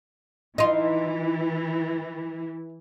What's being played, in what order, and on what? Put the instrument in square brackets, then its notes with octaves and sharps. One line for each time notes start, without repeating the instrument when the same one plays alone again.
[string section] E3 [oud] D#4 F4